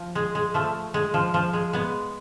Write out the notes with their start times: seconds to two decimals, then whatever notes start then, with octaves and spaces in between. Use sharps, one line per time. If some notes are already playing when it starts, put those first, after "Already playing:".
Already playing: F3
0.15 G#3
0.35 G#3
0.54 F3 A3
0.94 G#3
1.14 F3
1.34 F3
1.53 G#3
1.73 G#3 B3